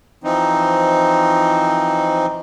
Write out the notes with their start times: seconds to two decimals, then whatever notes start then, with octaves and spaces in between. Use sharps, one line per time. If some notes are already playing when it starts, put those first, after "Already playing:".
0.24 E3 F3 C4 D#4